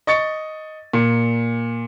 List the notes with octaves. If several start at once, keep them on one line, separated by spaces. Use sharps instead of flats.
D#5 C#6 A6 C#7
A#2